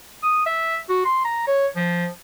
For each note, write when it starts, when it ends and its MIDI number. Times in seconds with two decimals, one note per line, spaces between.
0.23 0.43 87
0.46 0.78 76
0.89 1.01 66
1.05 1.20 84
1.24 1.44 82
1.47 1.67 73
1.76 2.07 53